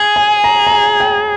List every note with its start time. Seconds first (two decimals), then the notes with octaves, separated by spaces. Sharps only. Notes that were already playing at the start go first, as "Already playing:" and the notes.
Already playing: G#4 G#5
0.16 G#5
0.44 A#5
0.67 A#5
0.72 G#5
1.00 G5